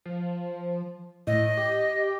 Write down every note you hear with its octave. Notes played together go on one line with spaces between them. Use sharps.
F3
A2 D#5
G4